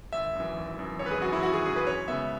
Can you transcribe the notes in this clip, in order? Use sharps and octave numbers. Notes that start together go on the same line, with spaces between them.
G#1 E5
F#2 E3
G#1
F#2 E3
G#1 C#5
B4
G#4
F#2 E3 F#4
E4
G#1 F#4
G#4
F#2 E3 G#4
B4
F#2 C#5
C#3 G#3 B3 E5